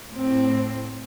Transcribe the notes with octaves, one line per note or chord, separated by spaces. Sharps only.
A2 C4